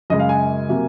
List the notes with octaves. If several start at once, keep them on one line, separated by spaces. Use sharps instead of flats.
F#2 C#3 G#3 D#5
F5
G#5
C3 F#3 A#3